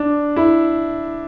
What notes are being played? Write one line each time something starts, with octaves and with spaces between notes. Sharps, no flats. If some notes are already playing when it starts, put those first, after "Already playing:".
Already playing: D4
E4